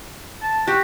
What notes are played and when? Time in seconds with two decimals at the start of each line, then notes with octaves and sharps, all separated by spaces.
0.42 A5
0.67 F#4 G4